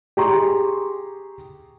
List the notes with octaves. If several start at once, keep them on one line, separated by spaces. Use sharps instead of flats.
G4 G#4 A#5 C6 C#6